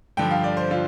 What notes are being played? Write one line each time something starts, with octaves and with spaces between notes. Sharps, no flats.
G2 D3 F3 G5
F5
D5
C5
D3 F4